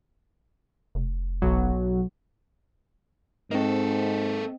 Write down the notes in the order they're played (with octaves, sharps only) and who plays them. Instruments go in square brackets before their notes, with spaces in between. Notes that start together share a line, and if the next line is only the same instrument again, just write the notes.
[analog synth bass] F1
[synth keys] B1 F#3
[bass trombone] G#2 [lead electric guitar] A#3 A4 [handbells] C4 D#5